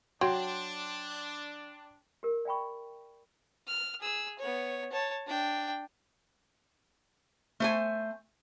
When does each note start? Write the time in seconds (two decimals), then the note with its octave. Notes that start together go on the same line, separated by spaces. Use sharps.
0.21 F#3 D4 G5 C6
2.23 G4 A#4
2.45 D5 E5 G5 B5 C#6
3.67 F6
4.00 G#4 E6
4.39 B3 C#5
4.92 C#5 A5
5.27 D4 G5
7.60 A3 C5 G#5